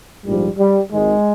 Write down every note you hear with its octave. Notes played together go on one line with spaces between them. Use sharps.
A#1 G#2 F3 G3
G3
G#1 G#2 D#3 G#3